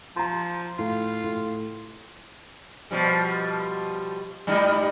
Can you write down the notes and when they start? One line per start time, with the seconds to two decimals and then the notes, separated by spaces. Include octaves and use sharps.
0.16 F3 A#5 C6
0.79 A2 F4
1.24 A2
2.91 B2 F3 G3
4.47 G#2 G3 D#4